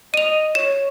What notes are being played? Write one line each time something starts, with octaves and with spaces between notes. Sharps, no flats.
D#5 D#7 F7
C#5 E7